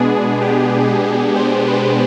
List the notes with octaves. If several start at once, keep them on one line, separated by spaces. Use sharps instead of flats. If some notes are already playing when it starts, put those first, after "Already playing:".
Already playing: B2 G#3 B3 D4 G#4
G4
G#4
C5
B4